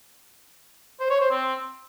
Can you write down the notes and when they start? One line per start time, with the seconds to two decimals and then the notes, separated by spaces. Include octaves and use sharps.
1.00 C5
1.10 C#5
1.20 C5
1.31 C4